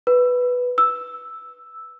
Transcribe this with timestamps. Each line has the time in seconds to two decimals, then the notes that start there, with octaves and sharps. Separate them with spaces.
0.07 B4
0.78 E6